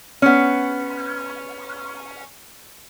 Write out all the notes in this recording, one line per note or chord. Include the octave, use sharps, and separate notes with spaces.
B3 C#4